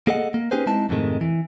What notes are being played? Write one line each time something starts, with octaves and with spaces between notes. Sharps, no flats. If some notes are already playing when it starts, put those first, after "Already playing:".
A#3 G#4 A4 D#5 F#5
A#3
C#4 D#4 G4 G#4 B4 C5
G#3 C4 D#4 E4 A5
F2 G#2 C3 D#3 G#3 A3
E3